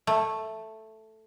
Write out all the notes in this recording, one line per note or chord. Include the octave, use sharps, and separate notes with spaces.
A3